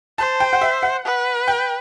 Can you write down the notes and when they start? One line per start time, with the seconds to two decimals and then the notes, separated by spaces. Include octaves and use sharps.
0.18 C5 A5
0.40 G5
0.53 F#5
0.61 E5
0.83 F#5
1.05 B4
1.48 G5